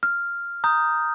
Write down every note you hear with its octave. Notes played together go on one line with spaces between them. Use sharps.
F6
A#5 D#6 G6